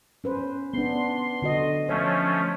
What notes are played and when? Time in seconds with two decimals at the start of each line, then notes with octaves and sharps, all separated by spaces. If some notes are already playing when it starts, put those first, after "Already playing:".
0.24 C#4 B4 C5
0.74 B3 D4 C6
1.42 D3 F#4 D#5
1.89 F3 A3 C#4 C#5